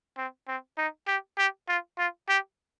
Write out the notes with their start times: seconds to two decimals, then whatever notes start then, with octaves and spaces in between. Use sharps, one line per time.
0.17 C4
0.48 C4
0.78 D#4
1.08 G4
1.38 G4
1.68 F4
1.98 F4
2.29 G4